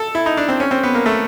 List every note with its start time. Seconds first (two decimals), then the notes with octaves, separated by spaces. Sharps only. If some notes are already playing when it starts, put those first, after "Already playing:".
Already playing: A4
0.15 E4
0.26 D#4
0.37 D4
0.49 C4
0.60 C#4
0.71 C4
0.83 B3
0.95 A#3
1.06 A3